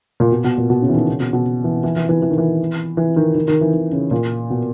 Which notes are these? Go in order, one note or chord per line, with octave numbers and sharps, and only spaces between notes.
A#2
B2
B2
A#2
B2
C#3
E3
D#3
C#3
B2
B2
E3
E3
E3
E3
E3
D#3
E3
E3
D#3
D#3
D#3
E3
D#3
C#3
A#2
B2